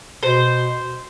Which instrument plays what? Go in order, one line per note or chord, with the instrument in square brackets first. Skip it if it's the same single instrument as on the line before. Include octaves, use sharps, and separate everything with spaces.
[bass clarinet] B2 [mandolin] C5